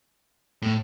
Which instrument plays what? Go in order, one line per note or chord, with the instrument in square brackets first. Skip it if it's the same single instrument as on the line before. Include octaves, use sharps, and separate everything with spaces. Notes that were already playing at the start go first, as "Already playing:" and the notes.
[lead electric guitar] A2